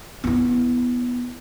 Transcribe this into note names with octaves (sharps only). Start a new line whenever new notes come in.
B3 E4